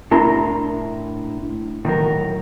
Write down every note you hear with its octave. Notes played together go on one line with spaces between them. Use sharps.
A2 D4 E4 A#4 A#5 C6
A2 D#3 F#3 A#4